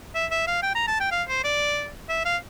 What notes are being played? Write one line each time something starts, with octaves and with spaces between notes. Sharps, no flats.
E5
E5
F5
G5
A#5
A5
G5
F5
C5
D5
E5
F5